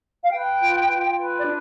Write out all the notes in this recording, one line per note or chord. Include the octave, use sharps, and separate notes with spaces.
F5
B4 G5
F4
F4
B4
D5
D4